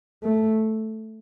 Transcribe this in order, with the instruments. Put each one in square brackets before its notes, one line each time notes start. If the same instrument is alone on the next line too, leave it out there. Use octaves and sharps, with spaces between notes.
[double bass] A3